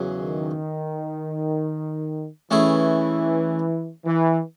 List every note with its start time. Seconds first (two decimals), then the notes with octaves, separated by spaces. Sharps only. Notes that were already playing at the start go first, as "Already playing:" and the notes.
Already playing: E2 C#3 F#3
0.20 D#3
2.51 E3 A3 C#4 E4 G#4 C#5
4.05 E3